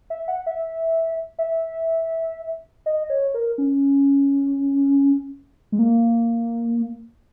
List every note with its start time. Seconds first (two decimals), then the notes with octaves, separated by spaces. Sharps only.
0.10 E5
0.28 F#5
0.46 E5
1.39 E5
2.86 D#5
3.10 C#5
3.34 A#4
3.58 C#4
5.72 G#3
5.79 A#3